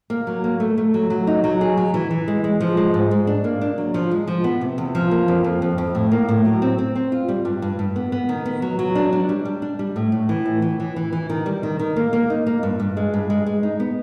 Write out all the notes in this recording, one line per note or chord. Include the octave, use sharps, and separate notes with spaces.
A#3
F#3
A#3
A3
A3
F#3
F#3
D#4
F#3
G#4
F#3
E3
E3
G#3
G#3
F3
G#3
G#2
G#3
D4
A#3
D4
F#3
F3
G#3
F3
B3
C3
E2
F3
A#3
F2
F2
F2
F2
A2
A#3
A2
F#3
C4
C4
C4
F4
G3
G2
G2
G2
B3
B3
D#3
B3
F#3
F#3
D4
D4
G3
G3
D4
G3
A2
A2
E3
A2
E3
E3
E3
E3
D#3
G3
D#3
D#3
A#3
A#3
D#4
A#3
G2
G2
G#3
G2
G#3
G#3
D#4
B3